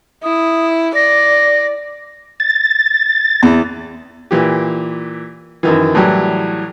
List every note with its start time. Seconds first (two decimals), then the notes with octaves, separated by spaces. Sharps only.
0.23 E4 D#6
0.95 D5 A#6
2.40 A6
3.43 E2
4.31 A#2 E3 G4
5.63 F#2 D#3 E3
5.95 A2 E3 F#3 G3